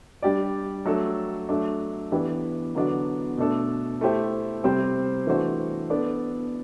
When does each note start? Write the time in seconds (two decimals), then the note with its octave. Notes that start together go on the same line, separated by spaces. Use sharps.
0.22 G3 D4 G4 D5
0.85 F#3 A3 D4 A4
1.49 F#3 A3 D4
2.12 E3 B3 D4 G4 B4
2.75 D3 F#3 B3 D4 F#4
3.37 B2 A3 D4 A4
4.01 A3 E4 G4 C5
4.64 C3 G3 C4 G4 C5
5.27 E3 A3 D4 F#4 C5
5.90 B3 D4 A4 D5